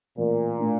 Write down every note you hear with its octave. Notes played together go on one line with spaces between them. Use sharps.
A1 A#2
A2 A3 D4